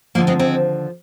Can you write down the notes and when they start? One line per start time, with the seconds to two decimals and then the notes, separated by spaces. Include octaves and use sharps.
0.15 D#2 D3 F3 G#3 A#3
0.27 G#3 C4
0.39 G#3 C4